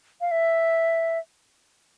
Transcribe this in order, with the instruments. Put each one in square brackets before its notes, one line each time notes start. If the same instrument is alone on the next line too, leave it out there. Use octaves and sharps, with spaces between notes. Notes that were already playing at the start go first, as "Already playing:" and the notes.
[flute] F5
E5